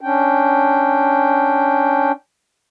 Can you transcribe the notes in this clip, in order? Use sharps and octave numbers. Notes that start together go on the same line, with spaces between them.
C#4 D4 G5